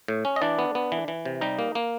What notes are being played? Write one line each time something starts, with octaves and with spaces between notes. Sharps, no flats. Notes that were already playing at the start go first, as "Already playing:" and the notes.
A2
C#4
D#5
E3 D4 D5
B3
B3
E3
E3
C3
G3 D#4 D#5
A#3
A#3